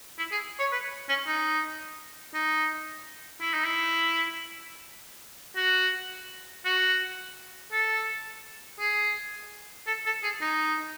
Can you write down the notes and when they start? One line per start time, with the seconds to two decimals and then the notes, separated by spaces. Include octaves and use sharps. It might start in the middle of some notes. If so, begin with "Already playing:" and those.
0.19 E4
0.32 G#4
0.60 C#5
0.72 B4
1.09 C#4
1.27 D#4
2.35 D#4
3.41 E4
3.54 D#4
3.65 E4
5.56 F#4
6.65 F#4
7.72 A4
8.79 G#4
9.87 A4
10.06 A4
10.23 G#4
10.42 D#4